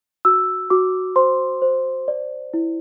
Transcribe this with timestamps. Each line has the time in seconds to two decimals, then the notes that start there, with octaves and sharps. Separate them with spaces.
0.25 F#4 E6
0.70 F#4 D6
1.16 C5 C6
1.62 C5
2.08 D5
2.54 E4